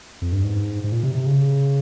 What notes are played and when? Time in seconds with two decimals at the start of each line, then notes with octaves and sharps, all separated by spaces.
0.22 F2
0.32 G2
0.44 G#2
0.84 G#2
0.92 A#2
1.03 C3
1.15 C3
1.26 C#3